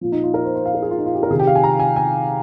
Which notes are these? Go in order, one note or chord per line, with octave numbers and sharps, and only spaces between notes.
A#2 F3
D#4
F4
A#4
C5
C5
F5
A#4
G#4
F4
D#4
F4
G4
A#4
C3 D#3 G#4
G4
F5
G#5
A#5
G#5
G#5